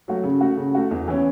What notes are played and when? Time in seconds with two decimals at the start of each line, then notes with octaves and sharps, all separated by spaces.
0.08 F#3 A3 F#4
0.24 C#3
0.41 A3 F#4
0.57 C#3
0.75 A3 F#4
0.91 E2
1.08 E3 C#4